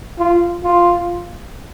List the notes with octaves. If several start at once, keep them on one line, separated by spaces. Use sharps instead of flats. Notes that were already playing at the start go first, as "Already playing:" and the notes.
F4
F4